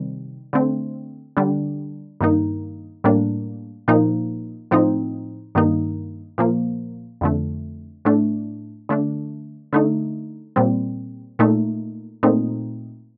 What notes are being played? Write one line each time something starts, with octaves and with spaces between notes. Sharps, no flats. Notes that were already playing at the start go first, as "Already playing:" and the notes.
Already playing: C3 D#3 G3
D3 A3 C4
D3 G3 D4
G2 D#3 A#3 D#4
A2 G3 A#3 D4
A#2 F3 A#3 D#4
A2 F3 C4 D#4
G2 D#3 A#3 D#4
A#2 F3 A#3
F2 D3 A3
A2 A3 D4
D3 A3 D4
D3 A3 D#4
A#2 G3 C4
A#2 A3 D#4
A#2 A3 C4 D#4